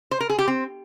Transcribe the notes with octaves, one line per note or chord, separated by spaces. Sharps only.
C5
A#4
G#4
G4
C4